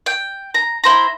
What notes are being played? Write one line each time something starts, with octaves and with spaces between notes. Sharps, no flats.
G5
A#5
E4 C5 A#5